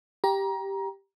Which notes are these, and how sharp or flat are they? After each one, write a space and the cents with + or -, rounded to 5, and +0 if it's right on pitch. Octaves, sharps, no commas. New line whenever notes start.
G4 +0 A#5 +25